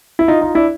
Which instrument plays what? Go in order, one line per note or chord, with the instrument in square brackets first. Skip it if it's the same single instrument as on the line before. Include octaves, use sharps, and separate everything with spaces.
[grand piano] E4
D#4 F4
D#4 F4
D4 E4